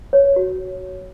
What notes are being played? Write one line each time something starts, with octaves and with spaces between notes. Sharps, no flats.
C#5
F#4